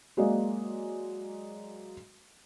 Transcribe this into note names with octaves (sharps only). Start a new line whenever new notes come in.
F#3 G#3 A#3 F#4 D5 D#5